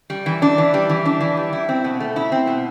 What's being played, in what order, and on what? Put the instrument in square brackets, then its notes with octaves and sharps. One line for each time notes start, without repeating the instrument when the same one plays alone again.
[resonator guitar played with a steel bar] G3
E3
D4
E3
G3
E3
D4
E3
G3
E4
C4
B2
A3
E4
C4
B2